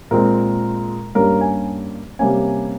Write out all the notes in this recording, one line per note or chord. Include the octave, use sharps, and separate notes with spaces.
A#2 G#3 C4 A#4
G2 G3 A#3 C#4 A#4
G#5
C3 G3 A#3 C#4 G#5